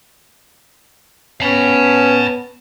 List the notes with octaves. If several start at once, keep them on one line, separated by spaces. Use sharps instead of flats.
B3 C#4 A5 B5